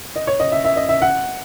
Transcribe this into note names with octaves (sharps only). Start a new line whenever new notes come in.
D#5
C#5
D#5
E5
E5
D#5
E5
F#5